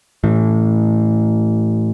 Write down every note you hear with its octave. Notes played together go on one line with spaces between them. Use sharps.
A2 E3